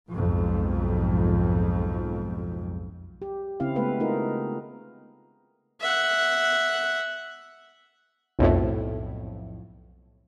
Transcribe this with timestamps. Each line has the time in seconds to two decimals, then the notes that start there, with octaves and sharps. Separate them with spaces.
0.11 B1 F2 G#2
3.22 G4
3.60 C#3 C4 E4 F5
3.75 G#3 A3 B3 B4 F5
4.00 A3 D#4 F4 A#4
5.81 E5 F#5
8.39 B1 F2 A2